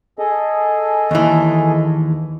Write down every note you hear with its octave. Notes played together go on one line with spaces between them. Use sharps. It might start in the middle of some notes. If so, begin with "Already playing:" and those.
G#4 A4 D#5
D#2 E3